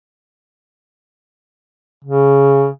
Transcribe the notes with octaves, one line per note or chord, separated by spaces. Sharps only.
C#3